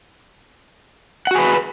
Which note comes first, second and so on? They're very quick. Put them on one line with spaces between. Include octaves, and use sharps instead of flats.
F#5 F#4 G#4 B4